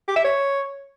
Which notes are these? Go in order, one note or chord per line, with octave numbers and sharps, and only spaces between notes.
G4
E5
C#5